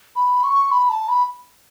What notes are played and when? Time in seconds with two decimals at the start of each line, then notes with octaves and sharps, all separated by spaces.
0.16 B5
0.44 C#6
0.71 B5
0.89 A5
1.08 B5